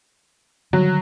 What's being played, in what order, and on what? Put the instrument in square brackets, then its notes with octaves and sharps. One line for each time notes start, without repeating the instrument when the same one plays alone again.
[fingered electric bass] D3 D#3 G3 [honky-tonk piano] F#3